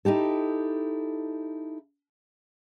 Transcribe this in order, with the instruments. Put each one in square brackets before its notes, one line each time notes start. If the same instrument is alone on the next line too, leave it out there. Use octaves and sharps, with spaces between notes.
[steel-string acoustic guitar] D#4 E4 G4 A4